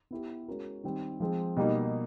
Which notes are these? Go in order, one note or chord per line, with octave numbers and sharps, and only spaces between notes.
B3 E4 G4
G#3 C#4 F#4 A#4
D#3 G3 C4
F3 G#3 C4
B2 G3 A#3 D#4